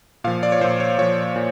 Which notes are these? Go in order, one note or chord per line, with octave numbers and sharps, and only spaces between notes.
A#2 F3 F5
D5
C#5
A#2 F3 C5
C#5
A#2 F3 C#5
A#2